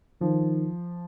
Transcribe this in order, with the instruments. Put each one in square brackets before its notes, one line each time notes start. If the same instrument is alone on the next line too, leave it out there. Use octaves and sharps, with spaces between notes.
[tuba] D#3 [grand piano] F3